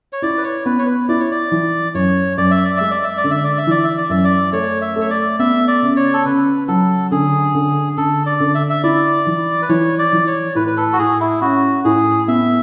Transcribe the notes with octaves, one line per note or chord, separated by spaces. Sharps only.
C#5
E4 D5
B4
C#5
B3 B4
C#5
B4
E4 D5
C#5
D5
E3
F#2 C#5
F#2 D5
E5
D5
G#3 E5
D5
E5
D5
D3
E5
D5
E5
E3 D5
E5
D5
F#2 E5
D5
A3 C#5
E5
A3
C#5
D5
B3 E5
D5
C#3
C#5
A4
C#3 B4
F#3 A4
D3 G#4
D3
D3 A4
D5
D3
E5
E5
E4 D5
E3
B4
E3 C#5
D5
E3
C#5
A2 B4
B4
A4
F#4
A2 G#4
E4
C#4 F#4
A2 G#4
B3 E5